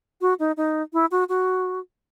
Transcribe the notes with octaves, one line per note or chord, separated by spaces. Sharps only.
F#4
D#4
D#4
E4
F#4
F#4